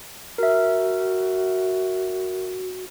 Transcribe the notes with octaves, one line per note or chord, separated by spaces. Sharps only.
F#4 A#4 E5